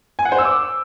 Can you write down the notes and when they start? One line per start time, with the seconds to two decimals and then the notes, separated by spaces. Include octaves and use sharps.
0.19 G#5
0.25 F#5
0.32 C5
0.38 E6
0.45 D6